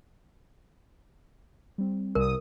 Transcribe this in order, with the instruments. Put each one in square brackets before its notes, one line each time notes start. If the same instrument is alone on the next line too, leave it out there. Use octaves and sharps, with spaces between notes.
[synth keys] G3 C4
[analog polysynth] C2 D#6 [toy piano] A#4